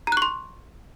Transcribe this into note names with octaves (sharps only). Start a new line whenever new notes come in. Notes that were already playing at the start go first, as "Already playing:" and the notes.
A#5 C6 C#6 F#6